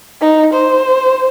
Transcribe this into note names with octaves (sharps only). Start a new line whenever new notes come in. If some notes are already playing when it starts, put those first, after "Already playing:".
D#4
C5